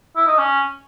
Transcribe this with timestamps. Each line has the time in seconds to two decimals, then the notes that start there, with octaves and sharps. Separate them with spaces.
0.17 E4
0.27 D#4
0.39 C#4